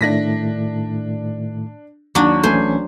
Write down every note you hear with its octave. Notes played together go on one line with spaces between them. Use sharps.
A2 D#3 A3 D4 A#6 B6
D#2 F#3 D4
A1 E3 A3 C#4 C5 G#5